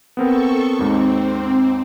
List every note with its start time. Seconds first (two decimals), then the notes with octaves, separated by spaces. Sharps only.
0.17 B3 C4 A4 A#4 C#6
0.79 D#2 G#2 C4